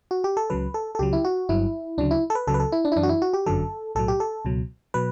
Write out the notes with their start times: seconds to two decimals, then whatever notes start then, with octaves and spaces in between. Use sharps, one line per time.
0.11 F#4
0.24 G4
0.37 A4
0.50 C#2 C#3 F#3 B4
0.74 A4
0.95 A4
0.99 C#2 C#3 F#3 G4
1.13 E4
1.24 F#4
1.49 G1 G2 F#3 E4
1.98 D2 C#3 F#3 D4
2.11 E4
2.30 A4
2.35 B4
2.47 C#2 C#3 F#3 A4
2.54 B4
2.60 A4
2.72 E4
2.85 D4
2.92 E4
2.96 F#2 E3 D4
3.03 F#4
3.09 E4
3.22 F#4
3.33 G4
3.46 G1 F#2 D3 F#3 A4
3.95 B1 A2 F#3 A4
4.08 G4
4.20 A4
4.45 C#2 B2 F#3
4.94 B2 F#3 B4